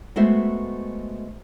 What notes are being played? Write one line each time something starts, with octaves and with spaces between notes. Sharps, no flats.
G#3 A3 B3 F#4 C5 E5